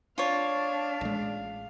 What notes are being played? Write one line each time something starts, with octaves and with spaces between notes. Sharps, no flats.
D4 F4 C#5 F5
A1 G#3